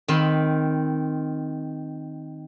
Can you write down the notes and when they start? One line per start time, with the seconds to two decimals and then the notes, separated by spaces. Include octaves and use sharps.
0.08 D#3 C4 B5 C6